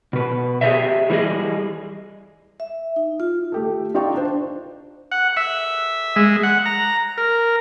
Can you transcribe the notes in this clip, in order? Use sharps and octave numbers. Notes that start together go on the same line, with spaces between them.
B2 B4
G4 G#4 A#4 C5 D#5 E5
E3 G3 A#3 G#4 D#5
E5
D#4
F4
A3 G4 A4
D#4 F4 D5 D#5 G5 C#6
D4 C5
F#5
E5
G#3
F#5
A#5
A#4